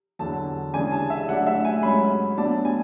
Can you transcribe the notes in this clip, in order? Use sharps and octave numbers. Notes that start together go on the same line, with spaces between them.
E2 D3 F#3 A5
C#3 E3 G#3 D4 G#5
A5
E5
A2 F#3 A3 D4 F#5
E5
G#5
G#2 F#3 C#4 B5
A2 F#3 B3 D4 A5
G#5